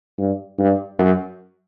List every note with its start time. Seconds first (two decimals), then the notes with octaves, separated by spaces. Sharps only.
0.18 G2
0.59 G2
0.99 F#2